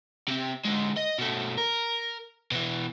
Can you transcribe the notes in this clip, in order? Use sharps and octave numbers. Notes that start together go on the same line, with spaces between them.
C3 C4
D3 G#3
D#5
B2 A3
A#4
B2 E3